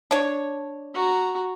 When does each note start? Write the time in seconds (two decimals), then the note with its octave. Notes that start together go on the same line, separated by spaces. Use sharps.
0.11 D4 C#5
0.95 F#4 A#5